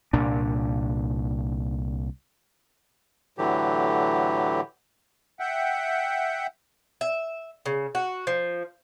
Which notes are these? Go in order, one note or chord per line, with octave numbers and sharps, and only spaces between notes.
C2 A#2 D4
A2 D3 E3 F#3 G4
E5 F#5 G5
E5
C#3
F#4
F3